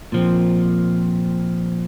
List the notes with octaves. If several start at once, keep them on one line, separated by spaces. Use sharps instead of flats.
A#2 F3 C4